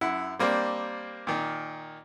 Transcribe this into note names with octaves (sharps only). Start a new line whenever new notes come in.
F#2 E4 F#5
G3 A#3 C4 D4
A#2 D#3